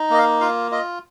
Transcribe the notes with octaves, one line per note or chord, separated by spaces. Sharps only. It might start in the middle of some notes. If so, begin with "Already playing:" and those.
Already playing: D#4
A#3 D#5
F5
F4 F5
F4 D#5